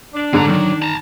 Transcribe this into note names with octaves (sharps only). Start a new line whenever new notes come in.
D4
G#2 D3 F#3 A#5
D#3 F#3
A5 A#5